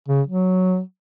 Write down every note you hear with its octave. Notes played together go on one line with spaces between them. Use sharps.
C#3
F#3